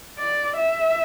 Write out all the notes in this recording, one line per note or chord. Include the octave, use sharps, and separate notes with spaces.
D5
E5